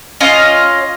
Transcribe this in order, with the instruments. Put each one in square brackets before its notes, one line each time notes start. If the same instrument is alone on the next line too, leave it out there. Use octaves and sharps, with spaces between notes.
[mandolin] C#4 F4 D#5